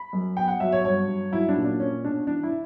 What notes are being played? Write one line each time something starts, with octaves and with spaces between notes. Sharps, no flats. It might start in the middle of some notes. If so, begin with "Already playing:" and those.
Already playing: B5
F#2
B3 G5
F#5
F#3 E5
C#5
G2 C#5
G2
F#3 E4
D4
A#2
D4
C#4
B2 D4
E3 D4
E4